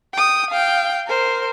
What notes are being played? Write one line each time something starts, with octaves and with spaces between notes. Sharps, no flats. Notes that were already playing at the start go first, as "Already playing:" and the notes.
G5 D#6
F5 G5
A#4 C5